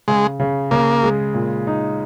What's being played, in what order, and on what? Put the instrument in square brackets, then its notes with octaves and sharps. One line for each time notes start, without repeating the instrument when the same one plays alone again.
[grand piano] C#3 [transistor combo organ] G#3
[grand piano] C#3
[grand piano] C#3 [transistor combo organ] A#3
[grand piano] G#3
A#2
D#4